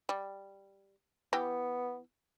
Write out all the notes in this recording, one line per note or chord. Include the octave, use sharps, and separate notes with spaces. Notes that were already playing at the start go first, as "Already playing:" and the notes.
G3
E3 B3 G4